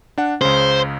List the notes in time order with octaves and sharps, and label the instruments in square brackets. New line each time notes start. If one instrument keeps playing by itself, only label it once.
[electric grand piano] D4 F#5
[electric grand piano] C#2 C#3 [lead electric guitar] C5